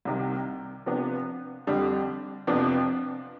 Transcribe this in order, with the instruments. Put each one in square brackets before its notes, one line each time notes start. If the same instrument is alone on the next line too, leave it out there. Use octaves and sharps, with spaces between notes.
[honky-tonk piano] C2 C3 D#3
C3 F3 B3 D4
F2 D3 G3 D4
F2 C3 F3 B3 D4